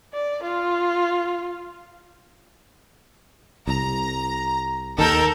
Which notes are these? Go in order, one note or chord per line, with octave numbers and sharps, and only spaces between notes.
D5
F4
C2 A#5
D#2 D#3 A4 A#4 G6